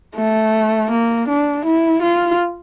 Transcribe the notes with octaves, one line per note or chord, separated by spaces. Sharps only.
A3
A#3
D4
E4
F4